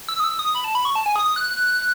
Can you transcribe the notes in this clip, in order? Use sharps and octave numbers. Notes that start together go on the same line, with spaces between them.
E6
D#6
E6
D#6
B5
A5
B5
C#6
A5
G#5
D#6
D#6
F#6